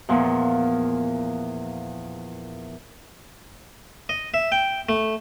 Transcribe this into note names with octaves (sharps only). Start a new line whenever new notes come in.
E2 A#2 F3
D#5
E5
G5
A3